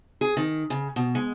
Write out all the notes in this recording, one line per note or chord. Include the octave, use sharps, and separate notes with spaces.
G#4
D#3
C#3
B2
G#3